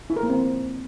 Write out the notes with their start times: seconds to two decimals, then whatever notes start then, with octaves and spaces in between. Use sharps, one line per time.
0.10 E4
0.16 A#4
0.23 A#3
0.30 C4